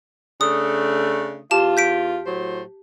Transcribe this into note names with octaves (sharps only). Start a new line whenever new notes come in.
C#3 A3 D4 D#6
E2 F4 G4 A5 E7
G6 B6 D7
A2 F#3 C5